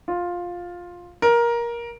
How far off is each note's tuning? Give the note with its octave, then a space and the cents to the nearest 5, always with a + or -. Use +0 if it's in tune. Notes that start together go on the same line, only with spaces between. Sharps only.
F4 +10
A#4 +15